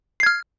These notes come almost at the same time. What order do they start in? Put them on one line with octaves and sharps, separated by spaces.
C7 G#6 F6